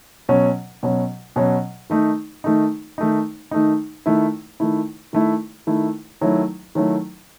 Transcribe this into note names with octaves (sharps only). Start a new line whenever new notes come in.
B2 F#3 C#4
B2 F#3 C#4
B2 F#3 C#4
D#3 A3 D#4
D#3 A3 D#4
D#3 A3 D#4
D#3 A3 D#4
D#3 A3 E4
D#3 A3 E4
D#3 A3 E4
D#3 A3 E4
D#3 F#3 A3 E4
D#3 F#3 A3 E4